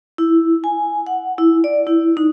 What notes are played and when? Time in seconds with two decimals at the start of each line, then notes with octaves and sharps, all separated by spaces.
0.18 E4
0.64 G#5
1.07 F#5
1.38 E4
1.64 D5
1.87 E4
2.17 D#4